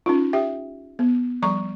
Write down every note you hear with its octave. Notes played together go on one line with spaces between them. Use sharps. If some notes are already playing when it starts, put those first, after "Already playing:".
C#4 D#4 F4
G4 E5 G5
B3
F3 G3 A#5 C#6